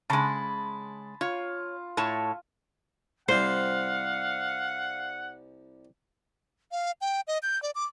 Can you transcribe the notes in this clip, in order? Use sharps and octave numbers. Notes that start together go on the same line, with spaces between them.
C#3 G#3 A5 B5 C6
F4 C#5
A2 C#5 A5
C2 G3 C5 F5 F#5
F5
G5
D#5
G6
D5
D6